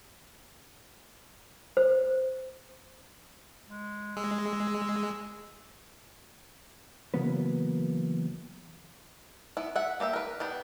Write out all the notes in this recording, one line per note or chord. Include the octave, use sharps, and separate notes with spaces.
C5
G#3
G#3 E6
C#3 E3 F#3 A#3 B3 B4
B3 E4
E5 F#5
A#3 G4 D#5 E5
A#4 B4
B3 D4 G4